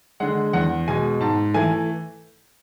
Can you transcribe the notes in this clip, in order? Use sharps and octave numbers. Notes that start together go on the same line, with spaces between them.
D3 G#3 F#5
E2 F#5
B2 G#3 G#5
G#2 A5
E3 A3 G#5